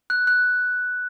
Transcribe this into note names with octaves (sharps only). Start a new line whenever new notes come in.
F#6
F#6